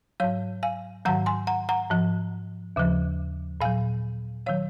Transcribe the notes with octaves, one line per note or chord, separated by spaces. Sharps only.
G#2 F#3 C#5 F5
F5 G#5
G#2 D#3 F#3 F#5 A#5
G#5 C6
F#5 A#5
F#5 A#5
G#2 F3
D#2 C#3 F3
A#2 F#3 F5 G#5
D#3 F#3 C#5 F5